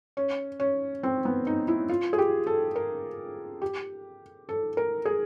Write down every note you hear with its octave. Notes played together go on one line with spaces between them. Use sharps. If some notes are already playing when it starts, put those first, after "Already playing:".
C#4
C#4
C4
B3
D#4
E4
F4
G#4
G4
A4
A#4
G4
A4
A#4
G#4